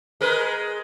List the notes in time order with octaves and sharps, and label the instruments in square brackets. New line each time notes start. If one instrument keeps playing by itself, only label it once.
[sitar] G#3 A#4 B4